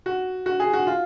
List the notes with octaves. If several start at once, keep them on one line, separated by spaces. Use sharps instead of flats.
F#4
F#4
G#4
F#4
F4